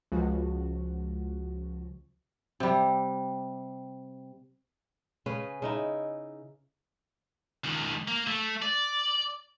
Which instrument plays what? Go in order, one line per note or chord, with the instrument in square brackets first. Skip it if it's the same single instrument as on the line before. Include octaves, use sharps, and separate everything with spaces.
[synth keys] C#2 F3 F#4
[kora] C3 G3
C#3 C#4 G#4 B4
C#3 D#4 E4
[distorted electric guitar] C#2 D#3
A#3
A3
D5